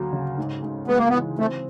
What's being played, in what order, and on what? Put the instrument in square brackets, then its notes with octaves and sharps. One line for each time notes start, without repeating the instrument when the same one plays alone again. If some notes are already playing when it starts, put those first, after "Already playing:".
Already playing: [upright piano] D2 F#3 A#3
C#3
G#2
G#2
[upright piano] G#3 [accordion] B3
[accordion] A#3
B3
[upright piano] E3
[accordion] A3 [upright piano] C4